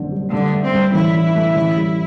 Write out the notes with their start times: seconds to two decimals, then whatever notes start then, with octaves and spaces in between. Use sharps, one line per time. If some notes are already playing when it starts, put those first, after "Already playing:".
Already playing: F#1 D3 C4
0.12 G3
0.32 G2 D3
0.53 A3
0.63 C4
0.74 G2
0.94 A1 E4
1.14 E3
1.35 A3
1.56 A1
1.77 G3